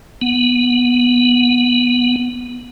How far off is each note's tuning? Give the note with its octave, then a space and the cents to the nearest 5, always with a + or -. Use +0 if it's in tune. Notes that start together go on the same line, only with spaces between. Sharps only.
B3 -10